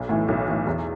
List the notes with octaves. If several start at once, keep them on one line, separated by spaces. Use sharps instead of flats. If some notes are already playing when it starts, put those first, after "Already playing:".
Already playing: B1
A2 E3
B1
A2 E3
E2